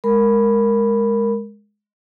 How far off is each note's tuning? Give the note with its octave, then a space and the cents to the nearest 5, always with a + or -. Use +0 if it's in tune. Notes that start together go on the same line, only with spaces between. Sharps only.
G#3 +0 A#4 -5 B5 +0